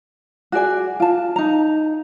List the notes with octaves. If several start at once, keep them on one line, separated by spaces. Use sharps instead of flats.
F#4 G#4 D5 G#5
F4 A5
D#4 A#5